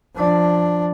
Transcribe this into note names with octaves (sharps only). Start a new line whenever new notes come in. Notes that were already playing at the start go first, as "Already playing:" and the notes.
F3 D4